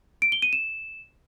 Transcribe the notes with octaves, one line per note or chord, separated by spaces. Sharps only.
D7
G7
D#7
E7